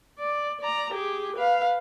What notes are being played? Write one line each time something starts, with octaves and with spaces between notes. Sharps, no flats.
D5
D5 A#5
G4 G#4
B4 F5